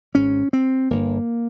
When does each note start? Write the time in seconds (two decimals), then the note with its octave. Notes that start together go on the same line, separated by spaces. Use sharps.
0.14 G#1 G#2 C#4
0.53 C4
0.90 G1 G2 A#3